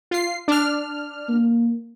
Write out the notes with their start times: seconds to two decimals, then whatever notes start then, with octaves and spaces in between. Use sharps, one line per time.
0.11 F4 C7
0.48 D4 F6
1.29 A#3